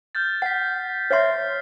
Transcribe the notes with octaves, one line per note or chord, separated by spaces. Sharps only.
F6 G6 A6
F#5 B6 C7
C#5 E5 C6 F6 C7